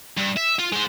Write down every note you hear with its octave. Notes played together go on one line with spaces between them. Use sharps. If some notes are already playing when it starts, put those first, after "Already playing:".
G2
E5
F4
G#3 C5